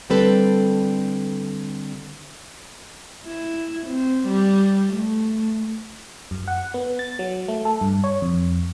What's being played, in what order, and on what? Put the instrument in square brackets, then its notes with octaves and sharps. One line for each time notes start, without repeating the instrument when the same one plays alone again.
[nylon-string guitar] D3 G3 C4 A4 B4
[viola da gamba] E4
C4
G3
A3
[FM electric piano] F#2
F#5
B3
A6
F#3
A3
A4
G2
C#5
F2